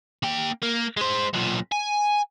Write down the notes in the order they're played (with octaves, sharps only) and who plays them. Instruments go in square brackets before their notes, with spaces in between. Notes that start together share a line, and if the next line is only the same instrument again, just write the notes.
[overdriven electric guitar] A#3 G5
A#3
G#3 C5
B1 A#2
G#5